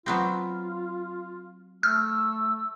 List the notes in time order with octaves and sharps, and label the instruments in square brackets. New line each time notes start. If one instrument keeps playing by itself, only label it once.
[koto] F#3 B3 C4 [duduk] F4
[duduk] A3 [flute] E6 [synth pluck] F6